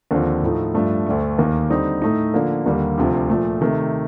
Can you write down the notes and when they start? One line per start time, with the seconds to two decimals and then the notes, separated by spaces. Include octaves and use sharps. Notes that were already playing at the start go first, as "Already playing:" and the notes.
0.11 D#2 D3 F3 C4
0.43 A2 F3 A3 D#4
0.74 G2 F3 A3
1.07 D2 D3 A3
1.38 D#2 D#3 A#3
1.70 D3 G3 C4 D#4
2.02 A2 A3 D#4
2.34 D3 F3 A#3
2.66 D#2 D3 G3 A#3
2.98 D2 C3 F3
3.30 A#2 F3 A3
3.61 C3 D#3 A3